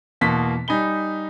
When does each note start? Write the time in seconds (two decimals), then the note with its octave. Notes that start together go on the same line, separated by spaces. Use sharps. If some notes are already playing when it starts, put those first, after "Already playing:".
0.21 E2 B2 A#3 A5 C6 B6
0.68 G3 D#4 G#5 B5 G7